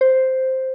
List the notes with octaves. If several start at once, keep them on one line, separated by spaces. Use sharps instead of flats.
C5